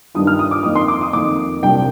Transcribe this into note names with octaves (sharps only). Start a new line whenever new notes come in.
G2 D#3 G3 D4 F4 D#6
F6
D#6
D6
F2 D#3 A#3 D#6
C6
D6
D#6
F2 D#3 A#3 D6
C2 A#2 G3 D4 F4 G5